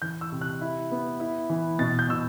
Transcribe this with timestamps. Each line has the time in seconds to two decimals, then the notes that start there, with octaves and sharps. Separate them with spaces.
0.02 E3 G6
0.21 E6
0.32 C3
0.41 F#6
0.61 E4
0.92 B3
1.20 E4
1.50 E3
1.79 B2 A6
1.99 G6
2.09 B2 E6